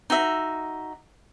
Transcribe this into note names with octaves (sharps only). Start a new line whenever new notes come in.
D#4 F#4 E5